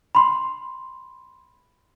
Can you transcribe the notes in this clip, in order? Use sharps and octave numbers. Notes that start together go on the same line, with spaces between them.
B5 C6